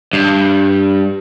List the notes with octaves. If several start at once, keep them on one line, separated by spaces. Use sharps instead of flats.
G2